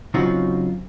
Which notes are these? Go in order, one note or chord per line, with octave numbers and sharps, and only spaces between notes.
C#3 F#3 C4 D#4 F4 F#4